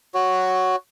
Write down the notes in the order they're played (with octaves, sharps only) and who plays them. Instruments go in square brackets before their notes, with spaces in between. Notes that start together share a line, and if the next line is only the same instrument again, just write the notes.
[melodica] F#4 C#5